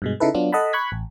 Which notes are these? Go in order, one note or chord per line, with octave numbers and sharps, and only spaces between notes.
G2 B2 G#3
C#3 D#4 E4 A4 B4
F#3 B3 D4 F4
A4 D#5 F#5 A5 B5
B5 C#6 F#6 G#6 B6
A1